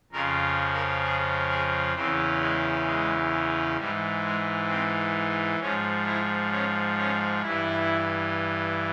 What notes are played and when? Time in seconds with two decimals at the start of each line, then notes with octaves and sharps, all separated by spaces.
0.12 F2 C#3 F3 A#4
0.73 A#4
1.03 G#4
1.49 G#4
1.95 E2 C#3 E3 C4
2.40 G#3
2.86 G#3
3.77 G#2 E3 G3
4.23 G#3
4.68 C4
5.60 G#2 F3 C#4
6.05 E4
6.51 C#4
6.97 C#4
7.42 G2 E3 E4